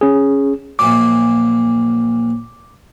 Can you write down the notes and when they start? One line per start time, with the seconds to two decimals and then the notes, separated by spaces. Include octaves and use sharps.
0.01 C#4 G#4
0.79 A#1 A#2 F#3 D6